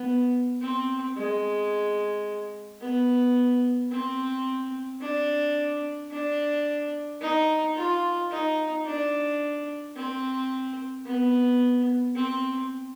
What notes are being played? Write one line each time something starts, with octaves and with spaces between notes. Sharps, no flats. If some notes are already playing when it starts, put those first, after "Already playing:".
Already playing: B3
C4
G#3
B3
C4
D4
D4
D#4
F4
D#4
D4
C4
B3
C4